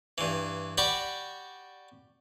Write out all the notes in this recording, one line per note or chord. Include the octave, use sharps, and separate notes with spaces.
G2 E3
F#4 G4 D5 B5 C#6